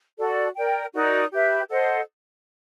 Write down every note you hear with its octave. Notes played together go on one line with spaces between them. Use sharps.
F#4 A4 D5
A#4 D5 G5
D#4 F#4 A#4 D5
G4 B4 E5
A4 C5 D#5 F#5